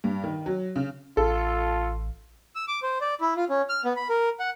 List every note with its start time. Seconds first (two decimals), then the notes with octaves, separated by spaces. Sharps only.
0.04 G2
0.24 D#3
0.46 F#3
0.76 C#3
1.17 A1 F4 A4
2.55 E6
2.68 D6
2.83 C5
3.01 D5
3.21 E4
3.36 F4
3.50 C#4
3.69 F6
3.85 B3
3.96 B5
4.10 A#4
4.40 F#5